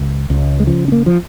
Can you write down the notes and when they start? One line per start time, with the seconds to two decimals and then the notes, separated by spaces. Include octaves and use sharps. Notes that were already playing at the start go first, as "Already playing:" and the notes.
Already playing: C#2
0.30 C#2
0.60 G#3
0.67 C#3 F3
0.88 C#4
0.92 A#3
1.06 F3